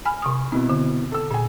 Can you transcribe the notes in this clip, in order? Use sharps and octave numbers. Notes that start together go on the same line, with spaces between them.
G#5 B5 F6
C3 C#6 D#6
B2 C4 E4
D3
A4 E6
A#2 G#4 G#5